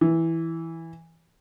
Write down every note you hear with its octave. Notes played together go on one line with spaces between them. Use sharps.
E3